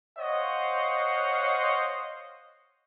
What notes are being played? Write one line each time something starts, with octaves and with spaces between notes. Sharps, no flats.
C5 C#5 D#5 F5 F#5